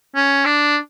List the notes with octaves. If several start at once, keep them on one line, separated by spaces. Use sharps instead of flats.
C#4
D4